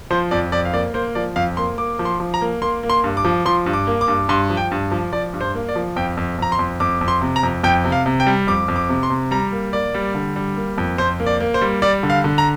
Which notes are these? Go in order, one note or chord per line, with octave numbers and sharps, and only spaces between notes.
F3 C5
F2 D5
F2 D5
F5
A#3 D5
A#3 C5
F3 D5
F2 F5
A#3 C6
A#3 D6
F3
C6
F3
A#5
A#3
A#3 C6
A#3
C6
G2
D6
F3
F3 C6
G2
D6
A#3
D6
G2
G2 C6
F3
G5
G2
F3
F3 D5
G2
C5
A#3
D5
F3
F2 G5
F2
F2 A#5
C6
F2
F2 D6
F2
C6
C3
A#5
F2
F2 G5
C3
F5
C3
G5
G3
F2 D6
F2
D6
C3
C6
C3
G3 A#5
A#3
A#3 D5
G3
D3
G3
A#3
F2
F2 C5
A#3
D5
A#3
C5
G3
G3 D5
D3
F5
D3
A#5